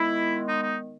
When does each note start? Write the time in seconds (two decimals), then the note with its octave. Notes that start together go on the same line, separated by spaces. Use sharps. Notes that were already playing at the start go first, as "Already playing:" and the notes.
Already playing: D#3 G#3 B3 E4
0.47 D#4
0.61 D#4